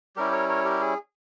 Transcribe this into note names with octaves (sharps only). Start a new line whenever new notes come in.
G3 C#4 E4 G4 A#4
A#4 C#5
A#4 C#5
G4 A#4
G#4